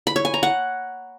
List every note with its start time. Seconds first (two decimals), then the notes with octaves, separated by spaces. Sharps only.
0.07 B5
0.16 C#5
0.25 G#5
0.34 A#5
0.43 F#5